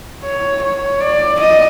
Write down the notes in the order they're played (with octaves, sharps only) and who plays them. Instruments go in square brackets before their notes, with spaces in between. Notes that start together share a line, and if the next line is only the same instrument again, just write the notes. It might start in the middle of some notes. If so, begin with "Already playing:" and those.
[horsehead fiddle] C#5
C#5
D5
D#5